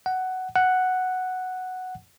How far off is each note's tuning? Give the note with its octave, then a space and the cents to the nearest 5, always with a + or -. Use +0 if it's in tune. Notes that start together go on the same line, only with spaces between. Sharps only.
F#5 +10
F#5 +0